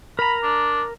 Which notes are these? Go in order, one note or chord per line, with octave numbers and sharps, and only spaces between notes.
A#4 A#5 B5
D4